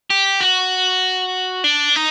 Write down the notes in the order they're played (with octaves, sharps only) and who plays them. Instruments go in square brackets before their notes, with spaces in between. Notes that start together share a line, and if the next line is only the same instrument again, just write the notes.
[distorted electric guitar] G4
F#4
D4
D#4